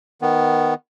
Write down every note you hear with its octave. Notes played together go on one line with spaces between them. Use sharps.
D#3 B3